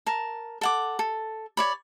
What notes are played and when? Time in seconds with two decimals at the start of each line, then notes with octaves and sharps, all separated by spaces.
0.06 A#4 A5
0.61 A4 F#5 D6
0.99 A4
1.57 C#5 D5 B5